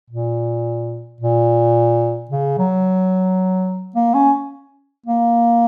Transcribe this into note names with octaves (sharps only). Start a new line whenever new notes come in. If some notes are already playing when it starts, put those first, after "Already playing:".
A#2
A#2
C#3
F#3
A#3
C#4
A#3